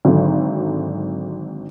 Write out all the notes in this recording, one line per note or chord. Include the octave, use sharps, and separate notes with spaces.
G#1 D3 F#3